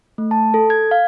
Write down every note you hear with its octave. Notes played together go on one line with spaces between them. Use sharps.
A3
A5
A4
G#6
F5